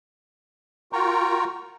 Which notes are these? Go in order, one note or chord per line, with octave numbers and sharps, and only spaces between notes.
F4 F#4 A#4 G5 A#5 C#6